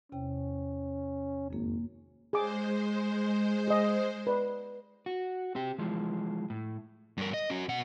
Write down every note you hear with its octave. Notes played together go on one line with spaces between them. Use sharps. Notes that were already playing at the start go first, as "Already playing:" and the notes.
E2 C3 C#4 G5
G#1 F2 A#3
G#3 G#4 C5 D6
G#4 D#5
B4 D5
F#4
C4 G4
E3 F3 G#3
A2
G2 A#4
D#5
C#4 F#4
B2 F#5